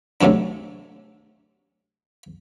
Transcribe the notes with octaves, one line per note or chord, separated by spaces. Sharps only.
D2 A2 C3 F#3 D4